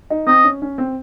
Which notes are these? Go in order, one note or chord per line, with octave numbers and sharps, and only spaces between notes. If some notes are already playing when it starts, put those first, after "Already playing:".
D#4
C4 D#5
C#4
C#4
C4